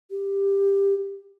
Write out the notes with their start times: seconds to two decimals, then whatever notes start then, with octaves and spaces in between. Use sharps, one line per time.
0.11 G4